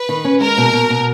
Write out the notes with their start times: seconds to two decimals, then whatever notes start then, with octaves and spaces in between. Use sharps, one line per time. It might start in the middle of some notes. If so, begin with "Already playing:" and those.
Already playing: B4
0.09 D#3
0.25 C#4
0.41 G#3 A#4
0.58 B2
0.73 B2
0.90 B2